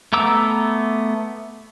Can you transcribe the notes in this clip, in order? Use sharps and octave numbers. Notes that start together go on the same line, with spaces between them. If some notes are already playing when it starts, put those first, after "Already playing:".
A3 B3 A#5 D6 E6